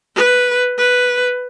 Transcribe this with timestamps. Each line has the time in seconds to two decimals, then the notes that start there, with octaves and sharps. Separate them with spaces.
0.15 B4
0.78 B4